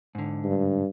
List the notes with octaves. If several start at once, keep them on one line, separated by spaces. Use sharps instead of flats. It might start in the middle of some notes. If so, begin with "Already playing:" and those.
G#2 D3
G2